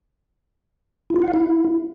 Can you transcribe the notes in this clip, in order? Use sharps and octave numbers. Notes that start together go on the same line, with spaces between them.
E4
F4
F#5
F5
E4